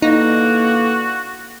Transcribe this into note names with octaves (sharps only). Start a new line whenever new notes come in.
D3 E3 A#3 D#4 F#4